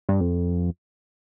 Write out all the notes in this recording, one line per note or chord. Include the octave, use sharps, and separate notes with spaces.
G2
F2